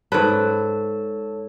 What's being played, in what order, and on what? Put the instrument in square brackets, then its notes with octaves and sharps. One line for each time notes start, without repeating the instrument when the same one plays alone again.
[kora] G#2 B4 [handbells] A4 C#5 A5